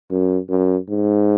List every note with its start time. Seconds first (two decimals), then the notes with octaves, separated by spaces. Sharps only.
0.11 F#2
0.50 F#2
0.89 G#2